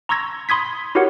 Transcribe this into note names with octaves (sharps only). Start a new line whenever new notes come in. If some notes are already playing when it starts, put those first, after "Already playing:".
A#5 C6 C#6 E6 G#6 A#6
B5 C6 D#6 G#6 B6
E4 F#4 G4 A#4 C#5 F#5